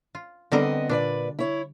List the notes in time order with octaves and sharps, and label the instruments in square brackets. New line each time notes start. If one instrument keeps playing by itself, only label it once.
[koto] F4
[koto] D3 G3 A#4 [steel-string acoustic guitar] B3 C4 D#5
[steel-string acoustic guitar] A#2 B4 D5 [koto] D4
[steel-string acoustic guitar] E4 C#5